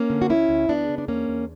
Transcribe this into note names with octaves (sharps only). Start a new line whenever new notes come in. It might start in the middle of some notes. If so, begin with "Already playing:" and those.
Already playing: A#3 C#4
D3
F#4
D2 C#4 E4
D2
D2 B3 D4
C#3
D4
E2 A#3 C#4
E2